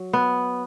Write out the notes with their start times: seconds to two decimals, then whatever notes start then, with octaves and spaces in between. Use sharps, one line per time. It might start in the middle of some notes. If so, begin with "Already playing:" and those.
Already playing: F#3
0.13 B3